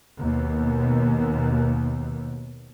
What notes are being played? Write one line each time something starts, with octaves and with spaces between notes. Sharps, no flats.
D#2 B2